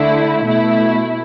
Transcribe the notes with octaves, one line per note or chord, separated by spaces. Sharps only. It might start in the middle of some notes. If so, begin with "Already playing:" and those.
Already playing: D3 A3 E4
B2 A3 E4